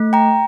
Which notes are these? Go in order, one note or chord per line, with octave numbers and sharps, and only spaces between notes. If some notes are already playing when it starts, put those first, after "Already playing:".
Already playing: A3
G5 A#5